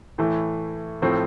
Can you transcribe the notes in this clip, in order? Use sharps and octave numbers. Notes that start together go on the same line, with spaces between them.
A2 E3 A3
A2 F3 A3 C4